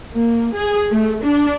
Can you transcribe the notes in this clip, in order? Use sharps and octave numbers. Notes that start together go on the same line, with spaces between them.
A#3
G#4
A3
D4